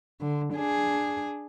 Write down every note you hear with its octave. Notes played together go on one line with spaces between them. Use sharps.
D3
D4 G#4